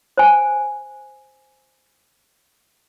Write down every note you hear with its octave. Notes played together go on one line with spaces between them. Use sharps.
C5 G#5